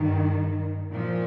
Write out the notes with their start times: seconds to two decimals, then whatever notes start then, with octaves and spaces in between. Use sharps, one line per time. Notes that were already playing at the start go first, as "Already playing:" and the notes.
Already playing: G2 D#3
0.92 A#2 F3